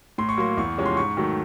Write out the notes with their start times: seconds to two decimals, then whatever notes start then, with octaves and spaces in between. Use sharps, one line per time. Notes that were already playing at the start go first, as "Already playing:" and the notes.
0.18 A2 C6
0.29 C#6
0.38 F#3 A#3 C6
0.57 E2 C#6
0.77 C3 F3 G#3 C#4
0.86 C6
0.97 G#2 C#6
1.17 D#3 F#3 A3